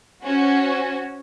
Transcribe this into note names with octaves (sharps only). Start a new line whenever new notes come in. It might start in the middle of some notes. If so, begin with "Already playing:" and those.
C#4 F#4 C5